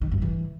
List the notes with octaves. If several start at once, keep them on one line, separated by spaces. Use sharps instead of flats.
D#3
G2
E3